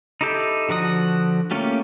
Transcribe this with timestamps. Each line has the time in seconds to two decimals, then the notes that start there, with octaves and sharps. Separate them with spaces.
0.21 D#4 E4 G4 A4 G6
0.69 D3 F3 F#4 D#6
1.51 A3 A#3 C#4 F4 G4